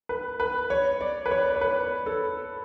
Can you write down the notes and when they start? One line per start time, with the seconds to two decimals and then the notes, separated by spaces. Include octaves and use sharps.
0.09 B4
0.40 B4
0.70 C#5
1.01 D5
1.26 B4
1.31 C#5
1.56 C#5
1.61 B4
2.06 A4